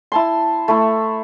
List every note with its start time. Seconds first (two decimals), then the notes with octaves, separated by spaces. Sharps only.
0.12 E4 A5 C6
0.68 A3 E4